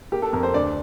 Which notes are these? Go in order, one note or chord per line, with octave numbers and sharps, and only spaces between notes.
A#3 G4
A4
F2 A#4
C5
D2 D5